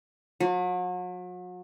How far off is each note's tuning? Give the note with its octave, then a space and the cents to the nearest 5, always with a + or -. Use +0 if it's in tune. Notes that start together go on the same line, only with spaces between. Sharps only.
F#3 -40